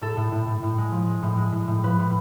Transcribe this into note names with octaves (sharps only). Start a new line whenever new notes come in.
A2 A4
A2
A2
A2
A2
G#3
F3
G#3
A2
G#3
A2
A2
F3 B4
A2